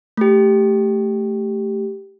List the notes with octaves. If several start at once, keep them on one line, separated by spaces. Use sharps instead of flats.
A3 G4